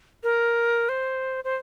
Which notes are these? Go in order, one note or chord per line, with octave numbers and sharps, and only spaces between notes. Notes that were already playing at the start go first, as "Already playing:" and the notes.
A#4
C5
C5